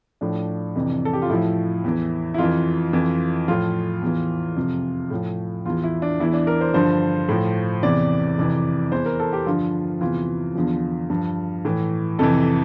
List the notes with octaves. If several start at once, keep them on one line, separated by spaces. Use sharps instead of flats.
A2 F3 D4
F2 C3 E3
A4
G4
F4
A2 F3 E4
E2 E3
E4
F2 F4
E3
F2 E3
A2 F3 F4
E2 E3
F2 C3 F3
A2 F3
E2 E3 F4
E4
D4
E2 E3 E4
D4
A#4
C5
G2 D3 F3 C5
A2 F3
E2 C3 E3 D5
F2 C3 E3
E2 E3 C5
A#4
A4
G4
G2 D3 F3 F4
E2 C3 E3 F4
E2 D3 F3
G2 F3
A2 E3
F2 C3 E3 A4